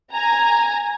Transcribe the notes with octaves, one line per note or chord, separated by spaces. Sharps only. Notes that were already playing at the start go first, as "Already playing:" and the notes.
G#5 A#5